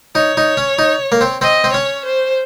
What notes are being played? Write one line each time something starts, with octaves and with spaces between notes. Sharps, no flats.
D#4 C#5
D#4
C#4
D#4
A#3
C4
C4 D#5
C4
C#4 C#5
C5